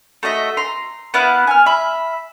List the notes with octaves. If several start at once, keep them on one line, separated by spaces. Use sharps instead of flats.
A3 F#4 D#5 E5
A#5 C6
B3 E4 F5 F#6
G#5 F6
E5 B5